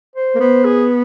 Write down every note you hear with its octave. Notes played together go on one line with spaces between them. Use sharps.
C5
A#3
B3 C5
G#4